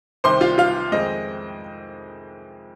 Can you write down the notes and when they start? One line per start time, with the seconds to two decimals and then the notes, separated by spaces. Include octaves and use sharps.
0.24 C2 C3 D#3 C5 C6
0.41 F4 F5
0.58 F4 F5
0.92 F2 D#3 G#3 C4 D#5